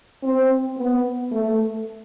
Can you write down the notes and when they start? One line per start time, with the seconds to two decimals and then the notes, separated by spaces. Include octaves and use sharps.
0.23 C4
0.77 B3
1.32 A3